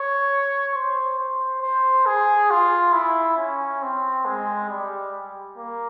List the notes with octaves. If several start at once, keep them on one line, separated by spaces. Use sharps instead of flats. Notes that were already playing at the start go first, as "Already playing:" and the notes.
Already playing: C#5
C5
C5
C5
G#4
F4
E4
C#4
C4
G#3
G3
A#3